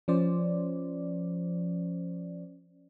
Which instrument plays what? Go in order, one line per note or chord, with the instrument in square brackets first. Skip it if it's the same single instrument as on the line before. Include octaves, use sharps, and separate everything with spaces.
[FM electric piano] F3 C#4 C5 D5